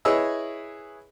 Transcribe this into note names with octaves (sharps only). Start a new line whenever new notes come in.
E4 G#4 B4 C#5 D#5 E6